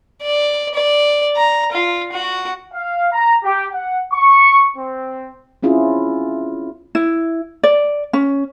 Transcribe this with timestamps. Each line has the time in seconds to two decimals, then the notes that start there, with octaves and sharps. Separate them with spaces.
0.22 D5
0.74 D5
1.37 A#5
1.72 F4
2.12 F#4
2.73 F5
3.12 A#5
3.44 G4
3.73 F#5
4.12 C#6
4.77 C4
5.63 C4 C#4 E4 F4 G#4
6.95 E4
7.63 D5
8.13 C#4